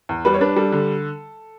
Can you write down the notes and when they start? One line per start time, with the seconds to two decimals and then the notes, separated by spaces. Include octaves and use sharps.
0.09 E2
0.25 G3 B4
0.34 C#5
0.41 D4 B4
0.56 G3 A4
0.72 D3